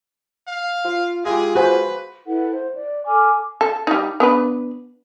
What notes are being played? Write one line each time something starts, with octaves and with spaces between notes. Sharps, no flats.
F5
F4
G#3 E4 F4 G4 G#4
F#4 B4 C5 G#5
E4 A4 B4 F#5
C5
D5
A4 G#5 D6 F6
A4
G3 D#4
B3 D4 B4